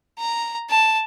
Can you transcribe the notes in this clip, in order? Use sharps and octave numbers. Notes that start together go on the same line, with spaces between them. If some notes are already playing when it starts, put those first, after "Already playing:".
A#5
A5